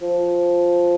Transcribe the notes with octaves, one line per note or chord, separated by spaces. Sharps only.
F3